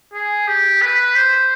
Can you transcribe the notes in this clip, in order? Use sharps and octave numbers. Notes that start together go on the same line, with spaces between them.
G#4
G4
B4
C5